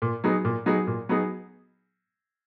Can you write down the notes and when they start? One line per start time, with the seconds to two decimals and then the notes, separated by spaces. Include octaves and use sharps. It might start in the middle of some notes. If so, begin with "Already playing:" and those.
0.02 A#2
0.24 F#3 B3 D#4 G#4
0.45 A#2
0.66 F#3 B3 D#4 G#4
0.87 A#2
1.09 F#3 B3 D#4 G#4